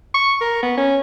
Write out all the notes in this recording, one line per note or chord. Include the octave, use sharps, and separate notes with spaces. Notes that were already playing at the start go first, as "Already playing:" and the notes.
C#6
A#4
B3
C#4